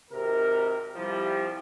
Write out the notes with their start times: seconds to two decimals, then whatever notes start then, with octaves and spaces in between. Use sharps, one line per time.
0.11 G#1 C3 A#4
0.95 C2 F3 G3 E4 G4